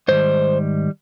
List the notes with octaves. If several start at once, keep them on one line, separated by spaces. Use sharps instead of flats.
G#2 D#3 G3 C5